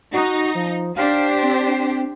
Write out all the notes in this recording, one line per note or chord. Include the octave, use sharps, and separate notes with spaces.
D#4 F#4
F3
D4 G4 C5 F5
C4